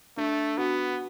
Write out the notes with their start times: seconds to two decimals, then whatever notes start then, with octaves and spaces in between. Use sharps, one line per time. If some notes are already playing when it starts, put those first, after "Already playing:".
0.17 A3 D4
0.58 B3 F#4